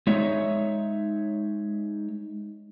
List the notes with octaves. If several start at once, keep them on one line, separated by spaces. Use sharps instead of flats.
G#3 D#4 C#5 E5